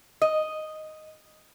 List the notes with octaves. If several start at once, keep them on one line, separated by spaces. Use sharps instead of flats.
D#5